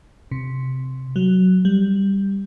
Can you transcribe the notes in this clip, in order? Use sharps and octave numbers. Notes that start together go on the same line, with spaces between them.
C3
F#3
G3